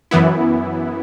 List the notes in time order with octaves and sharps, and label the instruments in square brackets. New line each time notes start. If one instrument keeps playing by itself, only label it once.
[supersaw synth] F#2 E3 B3 E4